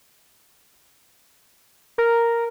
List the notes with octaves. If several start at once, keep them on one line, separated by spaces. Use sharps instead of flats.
A#4